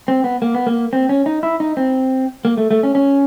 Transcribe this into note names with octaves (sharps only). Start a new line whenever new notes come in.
C4
B3
A#3
B3
A#3
C4
C#4
D#4
E4
D#4
C4
A#3
A3
A3
C#4
C#4